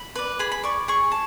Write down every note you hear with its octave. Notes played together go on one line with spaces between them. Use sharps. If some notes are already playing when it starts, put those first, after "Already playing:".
Already playing: B5
B4 D5
G#4 B5
B5
D5 C#6
G#4 C#6
A5